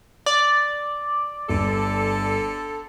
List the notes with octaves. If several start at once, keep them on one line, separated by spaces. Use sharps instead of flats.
D5
G1 D3 A4